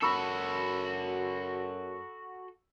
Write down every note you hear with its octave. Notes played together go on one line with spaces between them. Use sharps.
F#2 F#4 A4 B5 C#6 E6